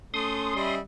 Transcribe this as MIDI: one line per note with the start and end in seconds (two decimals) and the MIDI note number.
0.14 0.56 57
0.14 0.79 61
0.14 0.75 84
0.14 0.75 87
0.56 0.80 55
0.56 0.80 75
0.56 0.80 76
0.56 0.80 83